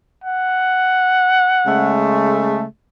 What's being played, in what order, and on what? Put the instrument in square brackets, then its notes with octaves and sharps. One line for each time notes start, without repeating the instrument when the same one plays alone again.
[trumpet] F#5
[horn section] C#3 G#3 A3